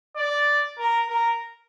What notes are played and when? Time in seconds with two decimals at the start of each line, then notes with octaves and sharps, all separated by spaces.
0.16 D5
0.78 A#4
1.08 A#4